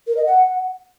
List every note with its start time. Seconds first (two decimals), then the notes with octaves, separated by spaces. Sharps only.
0.07 A#4
0.17 D#5
0.26 F#5